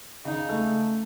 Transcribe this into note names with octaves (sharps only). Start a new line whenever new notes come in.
C#3 D#4
A3